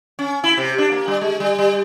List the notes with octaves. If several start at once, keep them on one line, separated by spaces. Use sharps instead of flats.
C#4
E4
C3
D4
A#3
G3
G#3
G3
G3